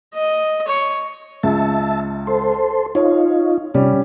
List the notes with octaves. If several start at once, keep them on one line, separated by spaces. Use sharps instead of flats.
D#5
C#5
C#2 E5 A5
A4 C5
D#4 F4 C#5
C3 G3 C#4